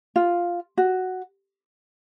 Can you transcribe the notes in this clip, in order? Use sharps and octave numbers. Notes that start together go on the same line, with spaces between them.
F4
F#4